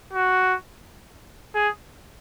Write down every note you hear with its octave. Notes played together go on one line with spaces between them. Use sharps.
F#4
G#4